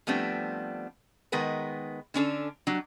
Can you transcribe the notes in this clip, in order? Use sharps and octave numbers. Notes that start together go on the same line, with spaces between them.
F3 G3 A3 B3 C4 D4
D#3 G#3 B3 A#4 B4
D3 C#4 D4 A4
F#3 G3 D4